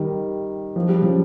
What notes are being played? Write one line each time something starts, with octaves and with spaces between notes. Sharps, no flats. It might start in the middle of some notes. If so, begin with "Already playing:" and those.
Already playing: D#3 G3
F3
G3
C#3 F3